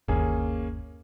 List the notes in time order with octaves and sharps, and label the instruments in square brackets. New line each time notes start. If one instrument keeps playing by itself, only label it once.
[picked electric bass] G1 D#2 [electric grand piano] A#3 C#4 G#4